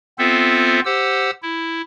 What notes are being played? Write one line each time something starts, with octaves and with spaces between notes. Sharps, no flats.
B3 C4 F4 A4 C5 E5
G4 C5 F#5 E6
E4